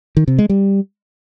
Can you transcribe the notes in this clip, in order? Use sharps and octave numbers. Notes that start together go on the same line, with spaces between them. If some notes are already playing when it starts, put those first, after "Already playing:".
D#3
C3
G#3
G3